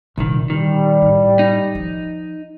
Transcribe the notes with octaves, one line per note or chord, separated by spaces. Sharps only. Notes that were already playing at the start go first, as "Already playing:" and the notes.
C2 A#2 D3 D#3
D#3 G3
A2
D#4
F3